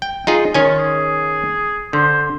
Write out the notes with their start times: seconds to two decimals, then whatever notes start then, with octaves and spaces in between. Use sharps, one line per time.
0.02 G5
0.27 D#4 F4 G#4
0.54 D#3 C#4 F4 G#5
0.79 G#4
1.93 D3 C5